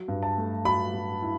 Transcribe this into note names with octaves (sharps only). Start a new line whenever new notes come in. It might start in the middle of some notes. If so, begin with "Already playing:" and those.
Already playing: F#3
G2
A5
A3
F#3 B5
F#3
E4